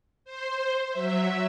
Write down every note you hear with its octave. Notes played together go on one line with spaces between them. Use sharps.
C5
F#3 E5